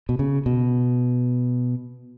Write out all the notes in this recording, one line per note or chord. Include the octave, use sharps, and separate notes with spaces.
B2
C#3
B2